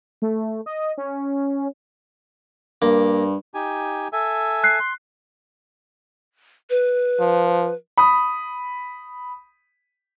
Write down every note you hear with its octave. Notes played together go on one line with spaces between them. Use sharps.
A3
D#5
C#4
G2 A#3
D#4 G4 G#5
A4 E5 G#5
F#6 C7
C6
B4
F3
B5 D#6